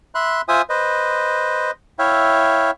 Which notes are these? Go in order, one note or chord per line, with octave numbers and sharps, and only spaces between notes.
E5 B5 C6 F#6
F4 C5 E5 G#5 D#6
B4 C5 D#5
E4 C#5 E5 F5 G5